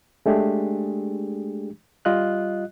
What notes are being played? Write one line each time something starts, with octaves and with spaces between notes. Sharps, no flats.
G#3 A3 D4 G4 G#4
G3 F4 D#5 F#6